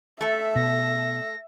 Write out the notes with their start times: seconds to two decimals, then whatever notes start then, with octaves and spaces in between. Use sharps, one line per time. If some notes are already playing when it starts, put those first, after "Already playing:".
0.21 A3 A4 E5
0.56 B2 A#6